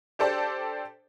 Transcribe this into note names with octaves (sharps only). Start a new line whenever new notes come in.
D4 G4 A4 C5 D5